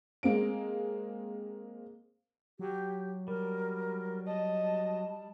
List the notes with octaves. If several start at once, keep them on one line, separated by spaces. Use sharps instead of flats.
G#3 A#3 C4 D7
F#3 G4
G3 A#4
D#5 A5